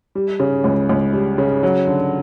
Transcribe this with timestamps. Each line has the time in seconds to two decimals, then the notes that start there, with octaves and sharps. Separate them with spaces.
0.15 G3
0.40 C#3
0.64 C#2
0.89 C#2
1.13 G3
1.38 C#3
1.63 F#3
1.87 D3